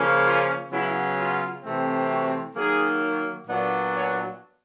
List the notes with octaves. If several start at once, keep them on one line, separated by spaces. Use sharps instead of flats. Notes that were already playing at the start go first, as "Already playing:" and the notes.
Already playing: C#3 F3 A#3 C#4
F4
C#3 F#3 B3 E4
F4
C3 E3 A3 C4
F#4
D#3 F#3 A#3 G#4
A#2 F#3 B3 D4 D5
C#5